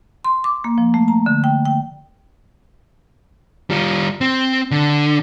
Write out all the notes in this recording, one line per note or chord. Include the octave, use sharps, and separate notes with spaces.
C6
D6
A#3
F3
A3
A#5
D3
G5
G5
G3 F4
C4
D3